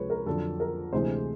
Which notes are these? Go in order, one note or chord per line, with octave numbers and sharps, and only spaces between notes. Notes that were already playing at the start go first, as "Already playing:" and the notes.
Already playing: C#2 C3 F3 G#3 B4 C#5
A#4
F2 D3 F#3 A4
A#4
D2 C3 E3 G#3 C5